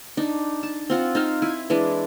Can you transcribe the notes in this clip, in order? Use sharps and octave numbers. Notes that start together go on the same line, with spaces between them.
D4 D#4
A5
C4 F4 F#5
D#4 C5 F5
E4 G#5
E3 G#3 D4